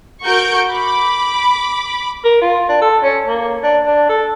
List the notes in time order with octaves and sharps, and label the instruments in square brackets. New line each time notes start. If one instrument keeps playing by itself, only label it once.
[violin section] F#4 A#4 C#6 G6 D7
B5 D6
[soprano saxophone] A#4
F4
D4
A4
C#4
A#3
D4
D4
A4